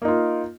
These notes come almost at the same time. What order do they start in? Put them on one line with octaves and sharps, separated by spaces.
A#3 D#4 F4